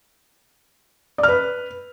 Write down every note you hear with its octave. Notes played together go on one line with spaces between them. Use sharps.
D5
F6
B4